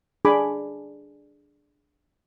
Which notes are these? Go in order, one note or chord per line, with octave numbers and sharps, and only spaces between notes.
D4 G#4 G#5 B5 D6